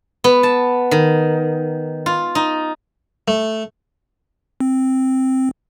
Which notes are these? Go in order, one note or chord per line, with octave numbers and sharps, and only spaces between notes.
B3
A5
D#3
F4
D#4
A3
C4